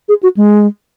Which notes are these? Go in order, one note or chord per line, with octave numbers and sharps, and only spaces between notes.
G#4
F#4
G#3